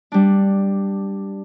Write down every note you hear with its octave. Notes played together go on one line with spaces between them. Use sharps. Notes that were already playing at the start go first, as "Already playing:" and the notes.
G3 D4